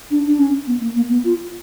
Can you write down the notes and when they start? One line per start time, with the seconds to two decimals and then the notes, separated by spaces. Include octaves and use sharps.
0.11 D4
0.26 D4
0.39 C#4
0.67 B3
0.81 A#3
0.96 A#3
1.09 B3
1.24 F4